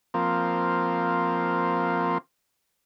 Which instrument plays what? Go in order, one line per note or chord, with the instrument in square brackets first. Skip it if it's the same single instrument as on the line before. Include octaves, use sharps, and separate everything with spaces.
[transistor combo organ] F3 A#3 C4